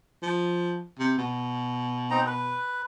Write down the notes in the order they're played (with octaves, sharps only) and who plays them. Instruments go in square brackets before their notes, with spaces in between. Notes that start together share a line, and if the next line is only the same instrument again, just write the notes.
[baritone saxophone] F3
C3
B2
[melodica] C4 D#4 A#5
B4